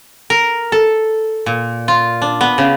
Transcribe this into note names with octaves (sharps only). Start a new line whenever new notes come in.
A#4
A4
A#2
F4
D4
B3
C#3